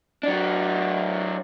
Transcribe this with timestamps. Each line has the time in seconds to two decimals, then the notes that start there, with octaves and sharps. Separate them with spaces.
0.23 F#3 D4